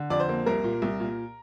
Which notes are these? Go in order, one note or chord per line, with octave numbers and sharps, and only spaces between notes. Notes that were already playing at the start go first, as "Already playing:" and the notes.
Already playing: D3
F2 D5
C5
A#3
C2 A#4
A#2
C2
A#2